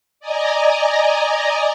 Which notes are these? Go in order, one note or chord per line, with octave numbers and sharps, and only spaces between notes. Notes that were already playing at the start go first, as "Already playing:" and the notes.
D5 D#5 G#5 A#5